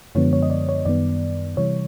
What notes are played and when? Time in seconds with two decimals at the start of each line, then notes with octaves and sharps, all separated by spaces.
0.15 F#2 D3 F3 G#3 B3 C#5
0.33 C#5
0.43 D#5
0.50 D5
0.69 C#5
0.85 F#2 D#3 G3 B3 D5
1.57 C3 E3 G3 C#5